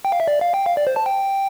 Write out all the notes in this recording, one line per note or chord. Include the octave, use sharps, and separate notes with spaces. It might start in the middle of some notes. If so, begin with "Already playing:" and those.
G5
F5
E5
D5
F5
G5
F5
D5
C5
A5
G5